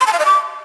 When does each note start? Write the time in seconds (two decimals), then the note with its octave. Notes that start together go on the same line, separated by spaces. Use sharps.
0.01 C6
0.07 A5
0.13 F5
0.19 D#5
0.25 D6